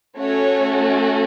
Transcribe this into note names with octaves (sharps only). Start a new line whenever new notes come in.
A3 C#4 F#4 A4 C#5